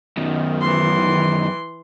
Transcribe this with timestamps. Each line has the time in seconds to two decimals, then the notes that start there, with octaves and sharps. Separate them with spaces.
0.17 F#2 B2 D#3
0.61 E3 C6